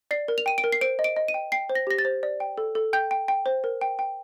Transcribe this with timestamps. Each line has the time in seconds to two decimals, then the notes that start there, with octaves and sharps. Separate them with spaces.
0.11 D5 C7
0.28 A#4
0.38 F7
0.46 G5 D#7
0.58 D7
0.64 A#4
0.72 C7
0.81 C5 D7
0.99 D#5
1.04 D7
1.16 D#5
1.28 D#7
1.34 G5
1.52 G5 C7
1.69 C5
1.75 A#6
1.87 G4 A#6
1.99 A6
2.05 C5
2.23 D5
2.40 G5
2.58 A4
2.75 A4
2.93 G5 G6
3.11 G5
3.28 G5
3.46 C5
3.64 A#4
3.81 G5
3.99 G5